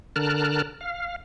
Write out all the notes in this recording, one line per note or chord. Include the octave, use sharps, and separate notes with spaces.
D3 A#4 A5 F6 F#6
F5